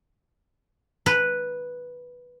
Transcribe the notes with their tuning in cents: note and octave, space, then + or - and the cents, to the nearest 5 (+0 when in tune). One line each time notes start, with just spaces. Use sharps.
B4 -5